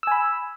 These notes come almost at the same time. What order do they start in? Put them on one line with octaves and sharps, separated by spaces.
E6 G#5 B5